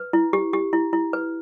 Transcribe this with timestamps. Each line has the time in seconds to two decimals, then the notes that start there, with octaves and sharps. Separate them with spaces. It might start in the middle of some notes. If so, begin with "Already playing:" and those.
Already playing: B4
0.13 E4
0.33 G4
0.53 G4
0.73 E4
0.93 E4
1.13 B4